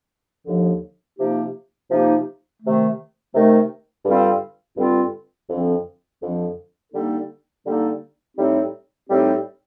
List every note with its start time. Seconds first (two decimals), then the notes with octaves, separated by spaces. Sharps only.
0.46 D#2 D3 F3
1.18 C3 F3 A#3 D#4 G4
1.90 C3 F3 A#3 D#4 G4
2.61 C3 D#3 A3
3.34 C3 D#3 A3
4.05 G2 D3 G3 C4 F4
4.77 G2 D3 G3 C4 F4
5.49 F2 D3 F3 C4
6.21 F2 D3 F3 C4
6.93 D3 G3 A#3 D#4 A4
7.65 D3 G3 A#3 D#4 A4
8.36 A2 G3 C4 D#4 G4
9.08 A2 G3 C4 D#4 G4